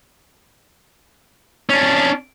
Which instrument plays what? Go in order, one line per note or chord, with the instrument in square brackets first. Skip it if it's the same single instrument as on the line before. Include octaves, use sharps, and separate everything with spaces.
[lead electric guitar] C#4 D4